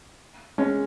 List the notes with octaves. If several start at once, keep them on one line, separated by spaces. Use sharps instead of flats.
G#3 C#4